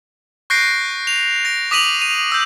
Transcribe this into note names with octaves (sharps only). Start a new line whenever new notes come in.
C#6 F#6 G6 A#6 C7 D7
F7
A#6 D7
D6 D#6 B6 D#7 F7 F#7
D#7
E6 G6